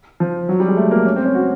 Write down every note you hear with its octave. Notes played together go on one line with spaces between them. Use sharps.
F3
F#3
G3
G#3
A3
A#3
C#4
C4
C#4
F#4